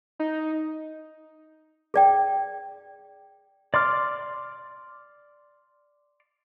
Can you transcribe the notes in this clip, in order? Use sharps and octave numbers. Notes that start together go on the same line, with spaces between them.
D#4
G#4 D5 G5
D5 C6 D6 F6